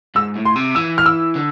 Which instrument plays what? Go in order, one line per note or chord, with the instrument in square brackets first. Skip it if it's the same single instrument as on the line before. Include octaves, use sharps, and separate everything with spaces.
[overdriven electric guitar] G#2 [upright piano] E6
[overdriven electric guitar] A2
[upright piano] C6
[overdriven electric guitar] C3
[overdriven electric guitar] E3 [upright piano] E6
[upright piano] F6
E6
[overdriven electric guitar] D3